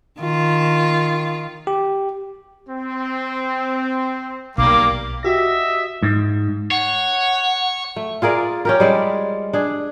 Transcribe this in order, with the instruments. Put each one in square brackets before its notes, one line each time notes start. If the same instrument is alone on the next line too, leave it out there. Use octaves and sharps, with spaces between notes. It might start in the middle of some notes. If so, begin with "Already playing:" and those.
[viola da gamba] D#3 F4
[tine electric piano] G4
[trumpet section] C4
[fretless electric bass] B1 [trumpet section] G3 A#3 [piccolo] D6
[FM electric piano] F#4 G4 A#6 [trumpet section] D#5 E5
[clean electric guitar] G#2
[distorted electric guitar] C#5 [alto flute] F#5
[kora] A3
F4 G#4 A#4 D5
C#4 G4 A#4
G3 G#3 D5
D4 G#4